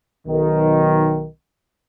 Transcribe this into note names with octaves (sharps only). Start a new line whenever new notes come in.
B1 D#3